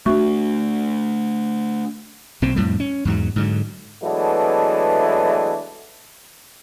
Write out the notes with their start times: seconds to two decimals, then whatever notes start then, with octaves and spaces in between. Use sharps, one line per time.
0.06 A3 B3 D4 F#4 E5 C#6
2.42 B1 A#2 C4
2.56 F2 A2 G3
2.80 C#4
3.05 E2 G#2 F#3
3.36 G#2 D3 F#3
4.03 E3 F#3 G#3 A3 B3 D4